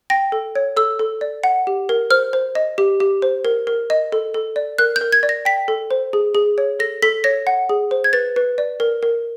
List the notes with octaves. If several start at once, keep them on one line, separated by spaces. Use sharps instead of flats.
G5 A#6
A4
C#5
A4 E6
A4
D5
F#5
G4
A#4
C5 F6
C5
D#5
G4
G4
C5
A#4
A#4
D#5
A4
A4
D5
A#4 F#6
G6
A#4
G#6
D5
A#6
G5 B6
A4
C5
G#4
G#4
C#5
A4 A#6
A4 B6
C#5 A#6
F#5
G#4
C5
G#6
B4 A6
B4
D5
A#4
A#4